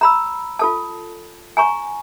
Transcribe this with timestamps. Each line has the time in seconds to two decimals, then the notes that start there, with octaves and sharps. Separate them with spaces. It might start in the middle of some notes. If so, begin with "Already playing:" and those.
0.01 A#5 B5 E6
0.59 F4 A4 A5
1.57 G#5 A#5 C#6